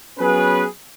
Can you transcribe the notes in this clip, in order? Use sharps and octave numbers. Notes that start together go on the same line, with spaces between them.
F#3 B3 C#4 G#4 B4